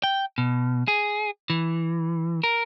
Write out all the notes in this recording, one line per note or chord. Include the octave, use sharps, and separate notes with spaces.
G5
B2
G#4
E3
A#4